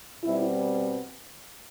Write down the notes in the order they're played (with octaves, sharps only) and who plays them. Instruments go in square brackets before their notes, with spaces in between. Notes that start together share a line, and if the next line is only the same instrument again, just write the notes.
[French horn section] B2 G3 C4 E4